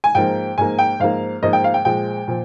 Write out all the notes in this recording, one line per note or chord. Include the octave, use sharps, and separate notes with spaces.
G#5
G#2 F3 A#3 G5
G#2 F3 A#3 G#5
G5
G#2 F3 A#3 F5
G#2 F3 A#3 D#5
G5
F5
G5
A#2 F3 G#3 G5
A#2 F3